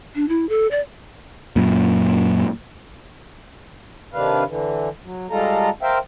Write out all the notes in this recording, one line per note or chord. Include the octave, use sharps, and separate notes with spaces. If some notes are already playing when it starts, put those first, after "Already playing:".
D4
E4
A4
D5
F#2 A#2
C3 D#3 D4 B4 F5
D3 E3
F#3
G3 G#3 F4 A4 A#5
A#4 C5 E5 F5 G5